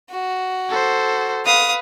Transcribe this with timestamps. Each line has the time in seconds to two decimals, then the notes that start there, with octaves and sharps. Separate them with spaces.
0.11 F#4
0.69 A4 C5
1.46 B4 F5 D#6